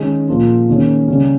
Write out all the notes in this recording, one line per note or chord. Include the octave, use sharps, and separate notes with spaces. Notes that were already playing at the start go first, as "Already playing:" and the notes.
Already playing: D#3 G#3 C#4 G#4
A#2 F3 A#3 F4 G#4
D#3 A#3 C#4 G#4
C#3 G3 C#4